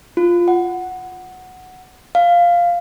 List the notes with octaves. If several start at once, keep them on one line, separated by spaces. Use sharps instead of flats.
F4
F#5
F5